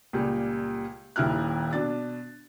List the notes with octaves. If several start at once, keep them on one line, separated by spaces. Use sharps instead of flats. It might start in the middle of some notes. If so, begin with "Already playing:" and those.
C#2 A#2 G3
D#1 D#2 E4 F6 F#6
B2 D4 A6